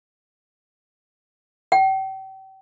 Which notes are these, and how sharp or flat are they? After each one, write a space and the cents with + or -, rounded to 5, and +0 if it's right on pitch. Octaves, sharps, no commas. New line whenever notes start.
G5 -35